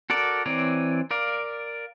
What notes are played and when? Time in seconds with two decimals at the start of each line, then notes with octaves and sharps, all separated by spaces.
0.10 F#4 A4 A#4 D5
0.46 E3 C4 C#5 D5 A#5
1.11 A#4 D5 F5